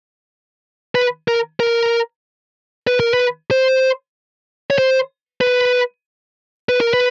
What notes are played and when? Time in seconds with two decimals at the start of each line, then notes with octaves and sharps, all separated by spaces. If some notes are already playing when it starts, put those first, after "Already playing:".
0.95 B4
1.28 A#4
1.60 A#4
2.87 B4
3.00 A#4
3.14 B4
3.51 C5
4.70 C#5
4.78 C5
5.41 B4
6.69 B4
6.81 A#4
6.94 B4